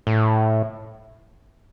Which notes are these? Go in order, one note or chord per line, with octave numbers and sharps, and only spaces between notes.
A2